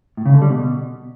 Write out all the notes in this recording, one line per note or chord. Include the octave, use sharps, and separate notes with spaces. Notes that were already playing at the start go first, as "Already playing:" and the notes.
A2
C#3
D3
G3
B2